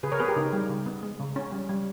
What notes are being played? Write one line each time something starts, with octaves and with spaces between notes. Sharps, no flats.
C#3 G#4 B4
A#4 C#5
B3 G#4 B4
G4 A#4
C#3 D#4
G3
C#3
B3
G#3
C#3
C#4
G3
G3